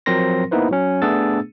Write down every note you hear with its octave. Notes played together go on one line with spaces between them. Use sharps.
F3 F#3 C4 A#4 C6 A#6
A#3 B3 D#4 E4 B4 C5
F#3 C#4
A3 B3 D4 G#4 E6 A6